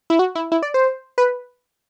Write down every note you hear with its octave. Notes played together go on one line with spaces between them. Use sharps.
E4
F#4
E4
E4
D5
C5
B4